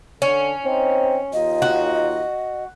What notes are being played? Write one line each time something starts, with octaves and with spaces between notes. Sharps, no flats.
D3 C#4
C4 D#4 C5
D#2 D#4 F4 D#5
F#4